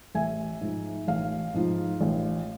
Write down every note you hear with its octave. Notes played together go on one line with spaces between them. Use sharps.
A1 E5 G#5
G#2 F3
A1 F5
G#2 F3
A1